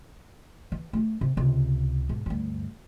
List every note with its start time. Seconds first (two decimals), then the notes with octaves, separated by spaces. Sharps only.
0.72 E3
0.93 A3 C#4
1.21 C3
1.37 C#2 C3
2.09 G#2 B2
2.26 D2 G2